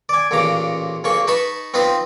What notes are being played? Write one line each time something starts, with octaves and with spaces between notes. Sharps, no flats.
D5 G#5
A1 A#2 C#3 A#5 D6
D2 C#3 A#3 C#6
D#4 B4 A5 B5 C#6
C4 D#4 F4 B4 D#5